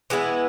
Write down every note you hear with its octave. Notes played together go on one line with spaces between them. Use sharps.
E3 G#3 B3 E4